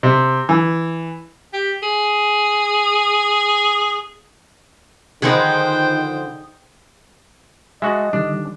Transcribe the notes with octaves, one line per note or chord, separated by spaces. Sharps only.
C3
E3
G4
G#4
D3 D#3 F3 D#4 G#4 B4 C5 G5
G#3 F#4 D#5 E5 A5
D3 D#3 G3 D4